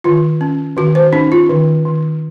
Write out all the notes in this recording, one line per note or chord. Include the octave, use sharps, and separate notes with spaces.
D#3 F4
C#4
D#3 F#4
C5
C#4 D#4
F4
D#3
D#3